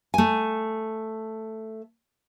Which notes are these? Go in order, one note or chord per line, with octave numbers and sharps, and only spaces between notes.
A3 G#5